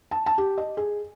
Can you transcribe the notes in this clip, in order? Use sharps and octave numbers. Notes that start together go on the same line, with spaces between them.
A5
A5
G4
D#5
G#4